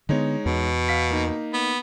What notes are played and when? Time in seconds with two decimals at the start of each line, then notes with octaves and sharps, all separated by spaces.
0.09 D3 G#3 B3 D#4 C#5
0.46 E2 B2
0.89 F5 B6
1.11 A#3 D#4
1.54 B3